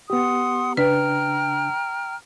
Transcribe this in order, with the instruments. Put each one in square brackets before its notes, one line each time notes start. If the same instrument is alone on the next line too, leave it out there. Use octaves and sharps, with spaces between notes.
[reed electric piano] B3 G4 [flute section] F#5 C6 D#6
[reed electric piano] C#3 D4 [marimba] B4 [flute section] G5 A#5 F6